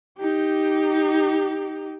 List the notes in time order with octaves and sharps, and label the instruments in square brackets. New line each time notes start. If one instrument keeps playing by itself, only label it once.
[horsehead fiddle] D#4 G4